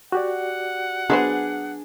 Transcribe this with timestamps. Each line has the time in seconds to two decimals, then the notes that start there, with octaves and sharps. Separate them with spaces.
0.12 F#4 G4 D5 F#5
1.10 F#3 B3 D4 G#4 C5